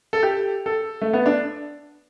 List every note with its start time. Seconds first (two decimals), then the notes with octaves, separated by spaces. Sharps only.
0.13 A4
0.23 G4
0.66 A4
1.01 A3
1.13 B3
1.26 D4